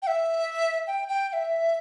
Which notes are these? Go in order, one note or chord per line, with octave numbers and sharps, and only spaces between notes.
G5
E5
G5
G5
G5
E5